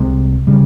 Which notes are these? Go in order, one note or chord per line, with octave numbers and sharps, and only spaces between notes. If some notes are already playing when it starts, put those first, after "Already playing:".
Already playing: C2 C3 G#3
C#3 G3